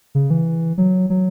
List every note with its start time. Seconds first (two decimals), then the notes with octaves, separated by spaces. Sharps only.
0.15 C#3
0.30 E3
0.78 F#3
1.10 F#3